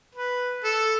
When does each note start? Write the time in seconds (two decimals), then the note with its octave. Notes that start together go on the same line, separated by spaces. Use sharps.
0.15 B4
0.64 A4